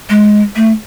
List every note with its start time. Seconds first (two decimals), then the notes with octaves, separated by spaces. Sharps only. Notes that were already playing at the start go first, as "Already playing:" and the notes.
0.10 G#3
0.56 A3